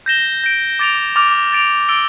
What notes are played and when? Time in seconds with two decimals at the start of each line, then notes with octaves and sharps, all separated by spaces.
0.06 G6 A#6 E7 G7
0.44 G6 A#6 D7
0.79 D6 A6 D7 F7
1.15 D6 F6 A6 D7 F7
1.53 A6 D7 F7
1.88 E6 A6 D7 G7